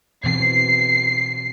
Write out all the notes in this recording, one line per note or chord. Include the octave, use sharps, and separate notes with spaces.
B2 E3 C4 C7